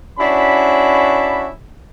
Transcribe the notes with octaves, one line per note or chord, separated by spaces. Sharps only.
C#4 D4 E4 F#4 B5